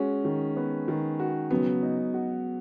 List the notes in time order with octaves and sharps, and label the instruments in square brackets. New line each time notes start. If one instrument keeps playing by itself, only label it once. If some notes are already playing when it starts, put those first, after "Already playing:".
Already playing: [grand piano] G#3 C#4 [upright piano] F#4
[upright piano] D#3
B3
D#3
F#4
[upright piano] C#3 [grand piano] F#3 B3
[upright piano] D#4
F#4